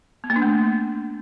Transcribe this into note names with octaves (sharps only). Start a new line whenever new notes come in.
B3
A#3
D4
A3